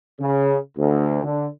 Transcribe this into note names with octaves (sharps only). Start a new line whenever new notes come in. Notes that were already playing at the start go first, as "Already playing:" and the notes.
C#3
D2
D3